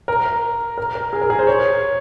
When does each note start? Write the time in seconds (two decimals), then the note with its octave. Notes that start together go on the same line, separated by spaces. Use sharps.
0.08 A#4
0.78 A#4
0.95 A#4
1.13 G#4
1.21 A#4
1.30 G#4
1.39 C5
1.47 C#5